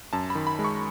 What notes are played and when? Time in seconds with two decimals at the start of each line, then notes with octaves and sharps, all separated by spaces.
0.13 F#2 A5
0.30 B5
0.35 D#3
0.47 B5
0.59 G#3
0.64 C#6